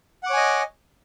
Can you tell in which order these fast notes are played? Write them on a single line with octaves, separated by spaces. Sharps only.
F#5 D6 C#5 G#5 D#5